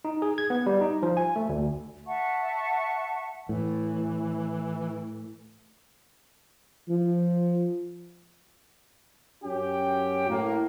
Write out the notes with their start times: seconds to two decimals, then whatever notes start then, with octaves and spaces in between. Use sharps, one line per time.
0.05 D#4
0.22 G#4
0.38 G#6
0.50 B3
0.66 G3
0.81 D#4
1.03 F3
1.17 G#5
1.36 A3
1.49 D2
2.06 E5 F#5 A5 C#6
3.49 A2 E3
6.89 F3
9.44 F#2 C#4 F#4 G4 G5
10.30 A2 A#3